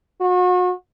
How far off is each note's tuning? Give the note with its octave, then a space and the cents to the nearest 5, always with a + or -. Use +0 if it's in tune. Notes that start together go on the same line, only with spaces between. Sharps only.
F#4 -40